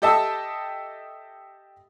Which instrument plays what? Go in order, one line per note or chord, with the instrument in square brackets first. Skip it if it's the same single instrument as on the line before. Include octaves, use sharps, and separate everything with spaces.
[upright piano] G4 A4 D#5 E5 A5